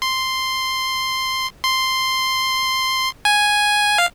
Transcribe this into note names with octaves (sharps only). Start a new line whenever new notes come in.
C6
C6
G#5
F5